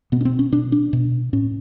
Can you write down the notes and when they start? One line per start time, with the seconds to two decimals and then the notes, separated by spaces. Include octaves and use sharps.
0.12 B2 B3
0.21 C#4
0.25 C4
0.39 C#4
0.52 B2 D4
0.72 D4
0.93 B2
1.33 A2 C#4